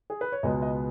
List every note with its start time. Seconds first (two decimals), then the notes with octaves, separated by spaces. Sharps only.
0.10 G#4
0.21 B4
0.32 C#5
0.43 C#2 B2 G#3 B3 D#5
0.62 D#5